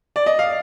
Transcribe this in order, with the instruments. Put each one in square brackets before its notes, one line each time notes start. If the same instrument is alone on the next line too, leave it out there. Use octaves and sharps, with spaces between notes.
[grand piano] D5
D#5
F5